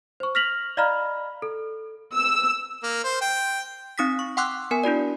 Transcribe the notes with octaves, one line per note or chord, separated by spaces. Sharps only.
C5 C#6
F6 A#6 B6 F7 F#7
D5 D#5 F5 A#5 B5 F6
A4
E6
A#3
C5
G5
C4 D#4 D#6 A#6 B6
C#6
F#5 G5 C6 D6 E6 F#6
B3 A#4 G#5
D4 E4 F#4 D5